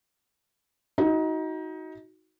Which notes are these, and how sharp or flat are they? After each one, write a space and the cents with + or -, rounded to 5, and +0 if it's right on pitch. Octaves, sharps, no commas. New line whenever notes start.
D#4 +25 F#4 +0